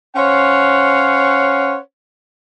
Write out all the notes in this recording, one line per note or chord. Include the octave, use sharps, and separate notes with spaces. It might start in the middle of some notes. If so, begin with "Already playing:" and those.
C#4 C5 C#5 F5 F#5